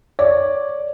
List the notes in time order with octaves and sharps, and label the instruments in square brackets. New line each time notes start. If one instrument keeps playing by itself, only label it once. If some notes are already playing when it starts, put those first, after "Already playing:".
[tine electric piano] C#5 [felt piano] D5